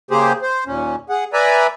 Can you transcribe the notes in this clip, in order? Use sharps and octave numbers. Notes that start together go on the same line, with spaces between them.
C#3 A#3 G4 G#4 C5
C5
D#2 A#2 C#4
G#4 F#5
B4 D5 E5 G#5 A#5 B5